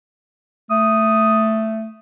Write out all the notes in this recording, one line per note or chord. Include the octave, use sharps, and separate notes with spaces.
A3 D#6